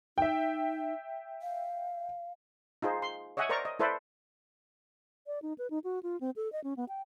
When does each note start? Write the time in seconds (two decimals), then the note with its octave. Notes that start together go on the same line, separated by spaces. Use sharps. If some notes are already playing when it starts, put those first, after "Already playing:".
0.18 D#4 E5 G5
1.42 F5
2.82 D#4 F4 G#4 C5
3.02 C6
3.37 C#5 D#5 E5 F#5 G#5
3.49 A#4 C5 D5 A#5 C#6
3.65 D#5
3.80 E4 A4 B4 C5 D5
5.27 D5
5.42 D#4
5.58 B4
5.70 D#4
5.84 F#4
6.03 F4
6.21 C4
6.36 A4
6.53 D#5
6.64 C#4
6.77 B3
6.89 G5